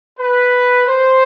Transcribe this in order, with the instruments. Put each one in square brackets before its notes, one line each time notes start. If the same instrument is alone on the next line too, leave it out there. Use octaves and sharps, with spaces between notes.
[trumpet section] B4
C5